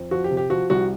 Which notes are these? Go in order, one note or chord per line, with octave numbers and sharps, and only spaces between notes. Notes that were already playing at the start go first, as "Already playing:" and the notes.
Already playing: F2
F3 F#4
G4
C3
G4
F3 F#4
C2 F#4